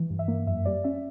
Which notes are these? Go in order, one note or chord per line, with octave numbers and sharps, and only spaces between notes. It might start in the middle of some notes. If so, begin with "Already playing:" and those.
Already playing: E3
G2
E5
A#3
F#2 E5
G3 D5
C#4 E5